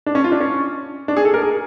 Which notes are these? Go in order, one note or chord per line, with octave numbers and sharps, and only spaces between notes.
D4
C#4
F4
D4
C#4
D4
G#4
A4
A#4
G#4